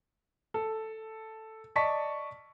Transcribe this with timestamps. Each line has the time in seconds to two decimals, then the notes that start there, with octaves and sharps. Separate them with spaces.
0.54 A4
1.76 D5 D#5 A5 C#6 B6